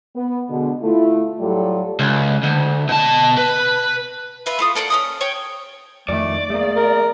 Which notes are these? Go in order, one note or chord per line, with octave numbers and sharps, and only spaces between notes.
B3
B2 D3 G#3
A3 E4 F4
A2 F#3 G3 F4 A4 D5
C#2
D2
B2 A5
B4
F4 B4 E5
A3 F4 D#6
A#3 A4 D5 F#5
C#4 E4 D#6
C#5 G5
F2 D#3 A3 D5
A3 A#3 G#4
A#4